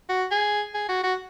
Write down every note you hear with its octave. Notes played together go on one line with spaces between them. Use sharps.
F#4
G#4
G#4
F#4
F#4